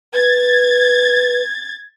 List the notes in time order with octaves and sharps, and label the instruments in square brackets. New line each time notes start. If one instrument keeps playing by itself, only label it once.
[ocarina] B4 [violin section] G#6 A6